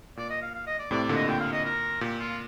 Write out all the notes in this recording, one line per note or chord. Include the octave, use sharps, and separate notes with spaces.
A#2 D5
D#5
F5
F5
D#5
D5
A2 C3 D5
D5
A#2 D3
D#5
A#2 G5
F5
D#5
A#4
A#2 G4
F4